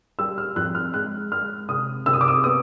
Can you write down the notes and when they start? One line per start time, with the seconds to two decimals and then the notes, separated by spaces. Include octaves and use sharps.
0.19 G3 E6
0.38 F6
0.56 F2 F#6
0.75 F6
0.94 G#3 F#6
1.32 G#3 F6
1.69 C3 D#6
2.06 C3 E6
2.13 D#6
2.21 D6
2.28 D#6
2.44 B3 D#6